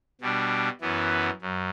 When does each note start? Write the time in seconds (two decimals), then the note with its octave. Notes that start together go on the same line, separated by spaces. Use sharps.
0.21 B2 G3 D4
0.81 F#2 E3 B3
1.42 F#2